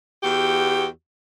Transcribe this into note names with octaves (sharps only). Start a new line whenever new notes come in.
E2 F#4 G4